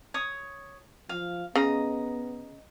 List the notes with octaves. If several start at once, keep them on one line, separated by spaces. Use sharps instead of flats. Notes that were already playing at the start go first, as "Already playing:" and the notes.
C#5 D#6
F3 F5
C#3 B3 D#5 A#5